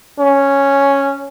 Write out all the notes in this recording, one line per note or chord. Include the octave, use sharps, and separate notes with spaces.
C#4